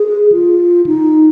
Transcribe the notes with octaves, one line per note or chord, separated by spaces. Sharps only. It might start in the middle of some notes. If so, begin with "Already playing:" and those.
Already playing: G#4
F4
D#4